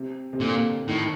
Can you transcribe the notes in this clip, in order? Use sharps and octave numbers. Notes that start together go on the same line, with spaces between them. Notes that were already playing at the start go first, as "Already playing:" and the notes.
Already playing: C3
C3
A#2 D3
A2 D#3